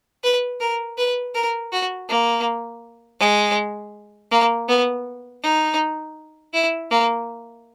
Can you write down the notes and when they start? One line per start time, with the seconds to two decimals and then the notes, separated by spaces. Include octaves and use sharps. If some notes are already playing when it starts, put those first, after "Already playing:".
0.24 B4
0.60 A#4
0.98 B4
1.35 A#4
1.72 F#4
2.09 A#3
3.20 G#3
4.32 A#3
4.69 B3
5.43 D#4
6.53 E4
6.91 A#3